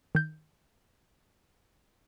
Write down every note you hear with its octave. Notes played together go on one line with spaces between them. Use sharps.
D#3 G6